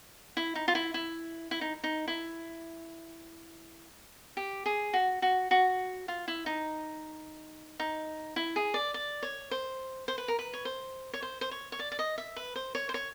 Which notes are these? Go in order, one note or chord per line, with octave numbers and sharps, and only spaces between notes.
E4
D#4
F4
E4
E4
E4
D#4
D#4
E4
G4
G#4
F#4
F#4
F#4
F4
E4
D#4
D#4
E4
G#4
D5
D5
C#5
C5
C5
B4
A#4
B4
C#5
C5
C#5
C5
C5
C#5
C#5
D5
D5
D#5
E5
B4
C5
C#5
C5
C#5